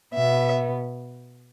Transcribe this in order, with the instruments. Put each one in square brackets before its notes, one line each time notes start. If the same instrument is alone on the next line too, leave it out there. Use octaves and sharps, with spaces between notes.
[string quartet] B2 B3 E5